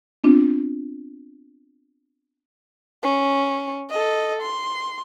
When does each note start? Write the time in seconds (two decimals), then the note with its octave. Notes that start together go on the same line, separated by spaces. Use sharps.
0.24 B3 C4 D4 F4
3.03 C#4
3.90 A4 D#5
4.42 C6